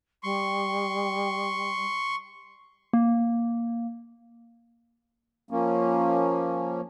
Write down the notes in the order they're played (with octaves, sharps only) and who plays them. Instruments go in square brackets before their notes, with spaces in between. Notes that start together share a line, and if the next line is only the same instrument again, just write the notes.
[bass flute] G3 [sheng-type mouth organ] C6 C#6
[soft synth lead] A#3
[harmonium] F3 A#3 C#4